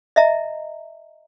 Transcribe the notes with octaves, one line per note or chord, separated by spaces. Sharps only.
D#5 E5 A#5